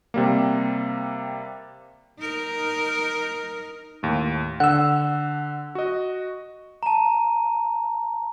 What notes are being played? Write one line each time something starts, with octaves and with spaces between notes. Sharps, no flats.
C3 G3 A#3
D#4 A#4
D#2 A2
D3 F#5 E6
F#4 D#5
A5 A#5